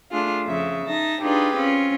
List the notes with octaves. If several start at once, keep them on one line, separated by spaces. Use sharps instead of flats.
A3 D4 F4 G#4
F2 C#3 E5
D#4 E5 A5 A#6
D4 D#4 F4 G4 G#4 B4
C4 C#4 F4